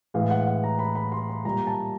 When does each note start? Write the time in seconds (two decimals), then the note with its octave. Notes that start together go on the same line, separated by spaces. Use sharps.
0.14 A2 E3 G#3 F5
0.30 F#5
0.46 F#5
0.64 A#5
0.79 B5
0.95 B5
1.12 C6
1.29 B5
1.45 A#2 G3 A#3 A#5
1.67 A5